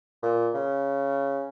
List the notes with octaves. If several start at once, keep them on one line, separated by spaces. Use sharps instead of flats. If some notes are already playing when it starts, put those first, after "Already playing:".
A#2
C#3